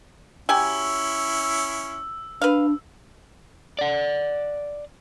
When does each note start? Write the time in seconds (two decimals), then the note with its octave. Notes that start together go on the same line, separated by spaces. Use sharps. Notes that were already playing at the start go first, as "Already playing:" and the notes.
0.49 F#3 C#4 E4 G4 G#5 E6
2.42 D4 B4 F5
3.79 D5 F#5